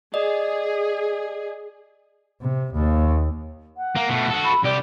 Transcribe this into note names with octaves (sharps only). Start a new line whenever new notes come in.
G#4 D5 D#5
C3
D#2
F#5
A#3
B2 A3
F#4 A4
B5
C2 G4 D5